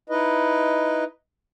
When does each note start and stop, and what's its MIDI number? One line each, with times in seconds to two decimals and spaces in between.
0.10 1.04 63
0.10 1.04 64
0.10 1.04 71
0.10 1.04 75